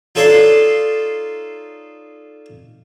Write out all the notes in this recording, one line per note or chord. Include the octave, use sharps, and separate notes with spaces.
D#4 F4 A4 C#5 D5 C6